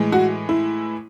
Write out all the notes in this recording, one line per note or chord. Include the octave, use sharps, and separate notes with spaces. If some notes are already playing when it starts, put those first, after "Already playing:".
Already playing: A2 E3 G#3
F#4
E4